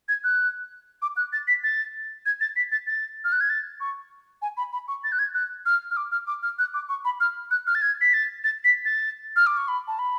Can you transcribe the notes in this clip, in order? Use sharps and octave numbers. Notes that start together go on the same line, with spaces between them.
G#6
F#6
D6
F#6
A6
B6
A6
G#6
A6
B6
A6
A6
F6
F#6
G#6
A6
C#6
G#5
B5
B5
C#6
A6
F#6
G#6
F#6
F6
F6
D6
F6
D6
F6
F#6
D6
C#6
B5
F6
F#6
F6
A6
G#6
B6
A6
A6
B6
A6
F6
D6
C#6
B5
A5
B5